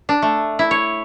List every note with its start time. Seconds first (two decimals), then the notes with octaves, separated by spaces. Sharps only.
0.09 D4
0.22 A3
0.59 E4
0.71 C#5